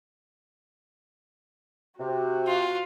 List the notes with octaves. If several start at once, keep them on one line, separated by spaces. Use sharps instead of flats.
C3 F#4
F4